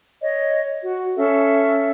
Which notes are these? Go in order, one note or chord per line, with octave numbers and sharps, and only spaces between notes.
C#5 D#5
F#4
C#4 A4 E5